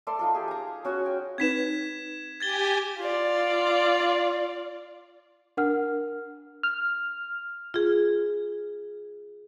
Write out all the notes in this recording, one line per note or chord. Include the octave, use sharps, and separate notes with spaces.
A3 A4 D5 C6
D#4 F4 A4
G4 G#4
G#5 A#5
C#4 F#4 C#5 G#5
G5
C4 D#4 B4 G#6 B6 E7
G4 G#5 G#6 A6 G7
F4 D5
D4 A#4 F#5 F6
F6
F4 G#4